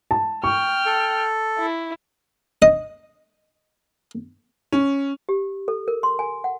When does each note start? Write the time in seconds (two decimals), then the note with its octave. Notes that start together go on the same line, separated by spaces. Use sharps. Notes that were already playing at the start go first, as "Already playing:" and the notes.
0.11 A5
0.44 G5 C#6 F6
0.86 A4
1.59 E4
2.62 D#5 D#6
4.72 C#4
5.29 G4
5.68 A4
5.88 A#4
6.03 C6
6.19 G#5
6.44 F#5